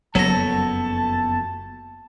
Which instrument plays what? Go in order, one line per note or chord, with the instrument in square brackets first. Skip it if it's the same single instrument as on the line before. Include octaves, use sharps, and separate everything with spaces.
[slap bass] F#1 F2 [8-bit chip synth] F#3 A#6 [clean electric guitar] B3 F#4 A4 [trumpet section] A5